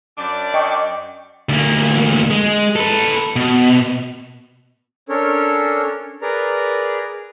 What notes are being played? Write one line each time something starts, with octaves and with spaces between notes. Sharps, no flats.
F#2 D4 D5
D#5 G5 C#6
D2 A#3
G#3
A4 B4
B2
C#4 D4 A4 A#4 C#5
G#4 A#4 B4 D5 A#5